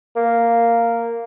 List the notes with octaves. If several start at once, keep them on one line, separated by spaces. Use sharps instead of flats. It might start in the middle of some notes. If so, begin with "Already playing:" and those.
A#3